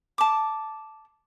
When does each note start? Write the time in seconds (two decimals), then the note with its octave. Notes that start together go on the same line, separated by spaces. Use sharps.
0.18 A5 D6